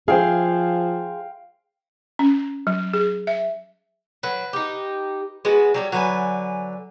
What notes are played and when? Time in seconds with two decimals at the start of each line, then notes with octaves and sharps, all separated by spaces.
0.08 F3 G#4 C5 F5 G5
2.19 C#4
2.67 F#3
2.93 G#4
3.27 E5
4.23 F#3 B4
4.53 D#4 G4
5.45 G#3 B3 F#4
5.74 F#3 G3 C#5
5.93 D3 F#3 B4 G#5